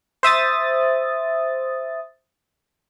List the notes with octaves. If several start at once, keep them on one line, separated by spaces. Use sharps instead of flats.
C5 E5 D#6 A6